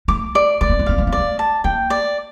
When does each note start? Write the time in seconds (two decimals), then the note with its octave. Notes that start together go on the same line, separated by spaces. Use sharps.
0.08 A3 D6
0.35 D5
0.61 A3 D5
0.70 A#3
0.79 A3
0.86 A#3 F5
0.98 A3
1.07 A#3
1.12 A3 D5
1.39 A5
1.64 A#3 G5
1.90 D5